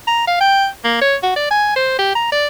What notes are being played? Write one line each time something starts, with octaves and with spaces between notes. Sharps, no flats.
A#5
F5
G5
A#3
C#5
F#4
D5
G#5
C5
G4
A#5
D5